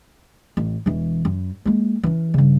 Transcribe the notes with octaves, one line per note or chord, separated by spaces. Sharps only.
A1
E1 E3
F#2
G#3 A#3
E3 C#4
G2 C#3